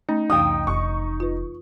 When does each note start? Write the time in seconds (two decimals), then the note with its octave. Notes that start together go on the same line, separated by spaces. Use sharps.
0.09 A3 C#4 D#4
0.30 C2 F2 E3 F5 G5 D#6
0.67 F1 C#6
1.20 F4 B4